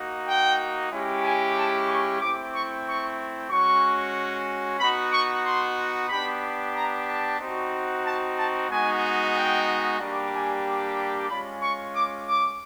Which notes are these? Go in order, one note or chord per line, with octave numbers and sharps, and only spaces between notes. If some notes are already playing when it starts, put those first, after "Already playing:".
Already playing: A#3 D#4 F#4
G5
G#3 C#4 E4 G4
G#5
A5
C#6
A3 C4 E4 D6
C#6
C#6
G#3 C#4 F#4 C#6
B3 D#4 F#4 B5
C#6
C6
B3 D4 G4 B5
A#5
A5
C4 D#4 F#4
A5
A5
G#3 B3 D#4 F#4 G#5
G5
G3 A#3 D4 G4
G#5
G#3 C#4 F4 B5
C#6
D6
D6